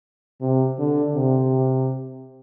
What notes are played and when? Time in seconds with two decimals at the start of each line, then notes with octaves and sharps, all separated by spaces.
0.41 C3
0.78 D3
1.15 C3